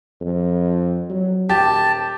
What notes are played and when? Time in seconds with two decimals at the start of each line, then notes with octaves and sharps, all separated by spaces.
0.21 F2
1.09 F#3
1.49 D#1 G4 A5